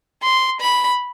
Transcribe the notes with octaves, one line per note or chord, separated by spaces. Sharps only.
C6
B5